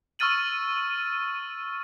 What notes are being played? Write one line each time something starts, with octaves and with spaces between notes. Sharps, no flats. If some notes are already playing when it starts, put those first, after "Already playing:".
C#6 E6 F6 A6 D#7 F#7